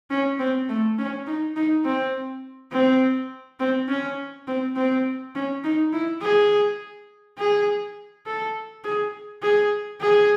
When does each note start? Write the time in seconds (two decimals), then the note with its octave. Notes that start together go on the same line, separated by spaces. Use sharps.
0.10 C#4
0.39 C4
0.68 A3
0.98 C#4
1.26 D#4
1.56 D#4
1.85 C4
2.72 C4
3.60 C4
3.89 C#4
4.47 C4
4.76 C4
5.35 C#4
5.64 D#4
5.93 E4
6.22 G#4
7.38 G#4
8.26 A4
8.84 G#4
9.42 G#4
10.01 G#4